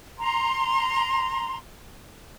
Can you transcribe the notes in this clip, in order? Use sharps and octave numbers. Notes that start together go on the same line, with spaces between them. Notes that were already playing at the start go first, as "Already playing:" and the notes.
A#5 C6